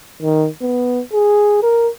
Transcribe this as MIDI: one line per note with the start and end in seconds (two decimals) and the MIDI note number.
0.22 0.47 51
0.62 1.00 59
1.13 1.61 68
1.63 1.88 70